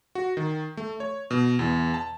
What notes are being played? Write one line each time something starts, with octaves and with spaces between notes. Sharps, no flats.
F#4
D#3
A3
C#5
B2
E2
A5